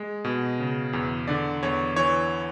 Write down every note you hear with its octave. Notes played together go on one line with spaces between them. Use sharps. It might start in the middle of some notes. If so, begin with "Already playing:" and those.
Already playing: G#3
B2
C#3
E2
D3 D5
E2 C#5
E3 C#5